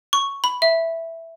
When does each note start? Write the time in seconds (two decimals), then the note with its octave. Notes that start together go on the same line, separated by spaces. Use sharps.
0.13 C#6
0.44 B5
0.62 E5